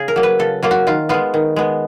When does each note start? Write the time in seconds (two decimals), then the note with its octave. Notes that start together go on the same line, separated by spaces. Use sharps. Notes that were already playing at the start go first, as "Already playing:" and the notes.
Already playing: C#3 G#4
0.08 A#4
0.16 F#3 A#3
0.23 B4
0.39 C#3 A4
0.62 F#3 A#3 F4
0.71 F#4
0.87 D#3 F4
1.09 G#3 B3 F4
1.34 D#3
1.56 G#3 B3